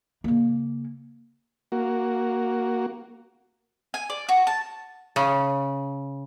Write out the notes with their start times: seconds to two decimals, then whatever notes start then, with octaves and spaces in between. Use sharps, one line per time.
0.24 C#3 A#3
1.72 A#3 F#4
3.94 G#5
4.10 D5
4.29 F#4
4.47 A5
5.16 C#3